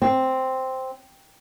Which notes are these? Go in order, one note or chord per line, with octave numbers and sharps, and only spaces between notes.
C4